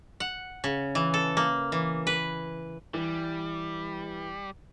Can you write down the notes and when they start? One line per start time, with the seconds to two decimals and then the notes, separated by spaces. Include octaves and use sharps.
0.20 F#5
0.64 C#3
0.95 E3
1.14 A4
1.37 A#3
1.72 E3
2.07 B4
2.94 E3 G3